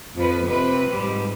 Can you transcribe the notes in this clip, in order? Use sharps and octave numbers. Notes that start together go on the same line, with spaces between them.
F2 F3 B4
C3 C4 B4
G#2 G3